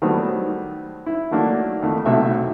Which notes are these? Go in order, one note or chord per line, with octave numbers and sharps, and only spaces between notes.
D#3 F#3 G3 A3 B3 C4
E4
D#3 F#3 A3 A#3 D4
F2 D#3 A3
B1 C3 F#3 A3 D#4 E5